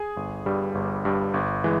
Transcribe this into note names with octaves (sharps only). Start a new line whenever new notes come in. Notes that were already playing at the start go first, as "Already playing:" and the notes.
Already playing: G#4 G#5
G1
G2 G3
G1
G2 G3
G1
E3 G#3